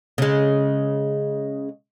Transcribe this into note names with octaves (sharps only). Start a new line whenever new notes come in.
C#3 G#3